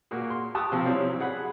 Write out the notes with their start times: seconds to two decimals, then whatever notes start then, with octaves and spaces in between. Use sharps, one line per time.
0.11 A#2 A#3 F#4 G#4
0.30 C6
0.55 G4 A5 C#6 D#6 E6 F#6
0.72 C3 F3 C4
0.85 F#3 G3 C4 C#4 E4
1.20 G#4 F#5 B5